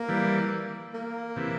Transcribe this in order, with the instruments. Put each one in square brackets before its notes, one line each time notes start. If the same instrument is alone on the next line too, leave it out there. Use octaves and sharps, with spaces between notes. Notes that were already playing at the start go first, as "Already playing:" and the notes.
Already playing: [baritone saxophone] A#3
[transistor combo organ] E3 G3
[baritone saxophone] A#3
[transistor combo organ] C3 E3